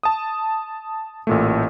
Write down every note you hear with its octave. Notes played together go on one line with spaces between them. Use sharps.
A5 D#6
A1 A#2 A3